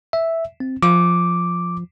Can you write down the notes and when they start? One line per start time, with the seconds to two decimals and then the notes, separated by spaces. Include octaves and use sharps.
0.13 E5
0.60 C4
0.83 F3 D6